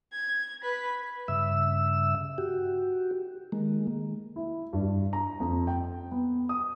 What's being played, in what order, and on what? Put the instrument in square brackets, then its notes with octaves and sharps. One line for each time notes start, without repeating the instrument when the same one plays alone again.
[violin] G#6
B4 B6
[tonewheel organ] G2 C#3 E5 E6
F#4 G4
D#3 G#3 A#3
[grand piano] E4
G2
A#5
F2
G5
B3
D#6